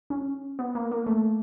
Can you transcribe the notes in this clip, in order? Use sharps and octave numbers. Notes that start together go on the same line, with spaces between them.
C#4
B3
A#3
A#3
A3